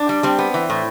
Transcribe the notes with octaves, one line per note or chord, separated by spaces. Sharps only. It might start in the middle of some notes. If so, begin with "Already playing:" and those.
Already playing: D4
G3
G3 C4
B3
E3
A2